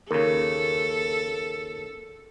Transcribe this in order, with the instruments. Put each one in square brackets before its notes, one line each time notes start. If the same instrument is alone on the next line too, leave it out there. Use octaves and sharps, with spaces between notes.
[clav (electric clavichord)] D#2 C#3 [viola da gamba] A4 [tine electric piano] A#4